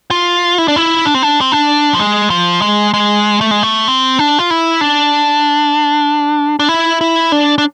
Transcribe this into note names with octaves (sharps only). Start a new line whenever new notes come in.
F4
E4
D4
E4
D4
C4
D4
C4
D4
F3
G#3
F3
G#3
G#3
A3
G#3
A3
C4
D4
F4
E4
D4
D4
E4
E4
D4
D4